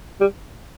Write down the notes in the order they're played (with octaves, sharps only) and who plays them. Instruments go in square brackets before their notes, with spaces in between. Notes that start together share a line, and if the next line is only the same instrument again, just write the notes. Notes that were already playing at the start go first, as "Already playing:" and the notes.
[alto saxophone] G3